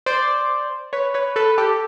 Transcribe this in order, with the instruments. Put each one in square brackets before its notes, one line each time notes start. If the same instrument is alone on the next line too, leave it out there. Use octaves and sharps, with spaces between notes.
[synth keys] C5 D5
B4 C#5
B4 C#5
A4 B4
G4 A4